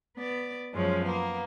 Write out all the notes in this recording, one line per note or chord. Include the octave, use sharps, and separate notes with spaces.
B3 D5
F#2 F3 G#3 C#4
A#3 B3